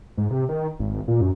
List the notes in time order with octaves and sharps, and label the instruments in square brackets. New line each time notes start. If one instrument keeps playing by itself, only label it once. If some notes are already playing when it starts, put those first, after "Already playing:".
[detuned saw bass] G#2
C3
D#3
G#1
A#2
F#2